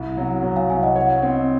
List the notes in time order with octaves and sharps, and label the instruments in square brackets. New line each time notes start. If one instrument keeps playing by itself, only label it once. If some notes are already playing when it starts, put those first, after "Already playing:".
Already playing: [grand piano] C2
F#3
F#3
[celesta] F5 G#5
[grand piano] C2 [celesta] F5 G#5
[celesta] D#5 F#5
[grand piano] C#5 [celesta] D#5 F#5
[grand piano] C4